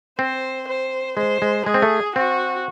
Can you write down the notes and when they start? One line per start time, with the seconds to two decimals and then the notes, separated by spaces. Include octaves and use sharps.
0.19 C4 C5
0.68 C5
1.17 G#3 C5
1.42 G#3
1.66 G#3 G#4
1.74 C4
1.82 A3
2.15 C4 F#4